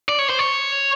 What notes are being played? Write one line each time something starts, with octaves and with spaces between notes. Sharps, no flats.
D5
C#5
C5
C#5